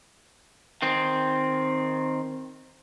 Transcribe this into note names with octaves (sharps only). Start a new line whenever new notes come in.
D#3 C4